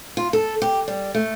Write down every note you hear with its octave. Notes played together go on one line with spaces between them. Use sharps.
F4
A4
G4
G3
A3